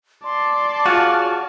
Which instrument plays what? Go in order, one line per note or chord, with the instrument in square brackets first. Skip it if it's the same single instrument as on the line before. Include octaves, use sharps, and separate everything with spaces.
[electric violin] D5 A5 [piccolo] C6
[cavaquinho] F4 G#4 C#5 [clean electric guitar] F#4 [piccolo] F6